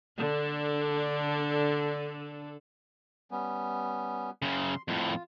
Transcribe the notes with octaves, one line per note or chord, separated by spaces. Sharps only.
D3 D4 A4
G3 B3 C#4
F#2 C#3 C6
F2 A2 F4